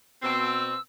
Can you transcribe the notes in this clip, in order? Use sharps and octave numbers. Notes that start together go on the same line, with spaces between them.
B2 C4 E6